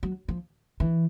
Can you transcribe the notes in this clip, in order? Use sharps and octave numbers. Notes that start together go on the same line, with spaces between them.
F#3
F3
E3